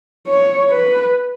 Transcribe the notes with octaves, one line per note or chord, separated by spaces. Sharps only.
C#5
B4